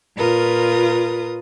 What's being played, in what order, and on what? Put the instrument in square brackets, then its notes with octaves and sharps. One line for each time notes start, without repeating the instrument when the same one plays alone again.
[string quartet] A#2 F4 A#4 B4 D#6